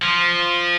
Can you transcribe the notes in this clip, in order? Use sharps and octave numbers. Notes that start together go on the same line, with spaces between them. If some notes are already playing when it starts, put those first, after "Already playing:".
F3